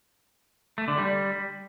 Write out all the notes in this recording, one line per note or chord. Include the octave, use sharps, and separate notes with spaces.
A3
D3
G3